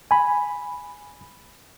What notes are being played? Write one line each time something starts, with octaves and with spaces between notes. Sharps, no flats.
G#5 B5